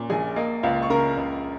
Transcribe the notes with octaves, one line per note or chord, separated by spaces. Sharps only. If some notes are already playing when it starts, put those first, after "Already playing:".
Already playing: A#2 C#4
A#1 G#4 G#5
A#3 D#5
C#2 F4 F5
C#6
C#3 A#4 A#5
C#2